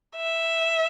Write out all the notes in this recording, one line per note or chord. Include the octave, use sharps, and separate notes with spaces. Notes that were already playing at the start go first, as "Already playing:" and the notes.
E5